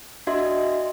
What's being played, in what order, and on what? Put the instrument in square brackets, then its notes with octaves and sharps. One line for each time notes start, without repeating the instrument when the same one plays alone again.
[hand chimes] D4 F#4 D#5 E5 C6